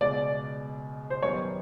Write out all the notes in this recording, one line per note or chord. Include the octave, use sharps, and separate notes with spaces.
C#2 B2 G#3 D5
C5
F#2 D#3 G3 B3 D#4 C#5